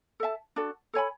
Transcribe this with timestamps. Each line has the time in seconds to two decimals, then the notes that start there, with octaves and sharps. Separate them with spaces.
0.20 A4 E5 A5
0.56 D4 F#4 A4
0.93 A4 C#5 G#5 B5